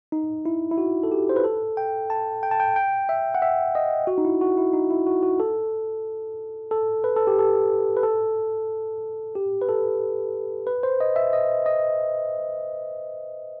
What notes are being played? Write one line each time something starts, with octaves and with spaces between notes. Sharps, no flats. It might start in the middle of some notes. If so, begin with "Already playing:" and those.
D#4
E4
E4
F#4
A4
G4
C5
B4
A4
G5
A5
G5
A5
G5
G5
E5
F#5
E5
D#5
F#4
D#4
E4
F#4
E4
D#4
E4
F#4
F#4
A4
A4
B4
A4
G4
A4
B4
A4
G4
B4
A4
B4
C5
D#5
E5
D#5
D#5